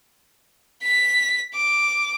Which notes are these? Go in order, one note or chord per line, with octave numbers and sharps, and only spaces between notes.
B6
D6